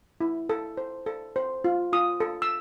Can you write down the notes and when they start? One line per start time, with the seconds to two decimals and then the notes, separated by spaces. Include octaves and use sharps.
0.21 E4
0.49 A4
0.77 C5
1.06 A4
1.36 C5
1.64 F4
1.93 F4 D#6
2.20 A4
2.42 E6